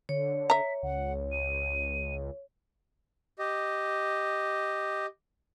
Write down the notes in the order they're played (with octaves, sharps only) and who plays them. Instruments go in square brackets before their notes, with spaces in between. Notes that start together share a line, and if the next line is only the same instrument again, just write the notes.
[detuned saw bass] D3 [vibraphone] C#5
[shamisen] E5 A#5 [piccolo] B6
[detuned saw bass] C#2 [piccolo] F#5
[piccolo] D#7
[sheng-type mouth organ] G4 D#5